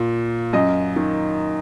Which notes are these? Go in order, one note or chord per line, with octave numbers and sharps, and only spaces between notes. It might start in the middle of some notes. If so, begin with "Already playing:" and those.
Already playing: A#2
F#2 D#5
D#3